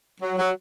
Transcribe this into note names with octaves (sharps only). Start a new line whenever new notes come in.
F#3
F#3